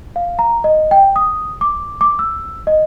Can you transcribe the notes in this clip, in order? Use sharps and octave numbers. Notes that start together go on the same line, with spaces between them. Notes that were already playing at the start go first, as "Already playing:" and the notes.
F5
A#5
D#5
G5
D#6
D6
D6
E6
D#5